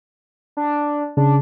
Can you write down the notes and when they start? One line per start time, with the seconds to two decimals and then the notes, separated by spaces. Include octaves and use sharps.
0.57 D4
1.17 C#3 D4